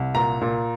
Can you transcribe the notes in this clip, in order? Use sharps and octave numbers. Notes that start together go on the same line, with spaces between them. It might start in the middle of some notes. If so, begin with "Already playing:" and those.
Already playing: C2
A#2 A#5
A#2